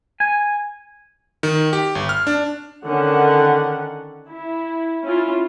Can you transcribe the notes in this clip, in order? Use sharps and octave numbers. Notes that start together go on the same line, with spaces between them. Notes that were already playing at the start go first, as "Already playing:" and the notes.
G#5
D#3
G4
G1
F6
D4
D3 D#3 C#4 D4 F#5
E4
C#4 E4 F4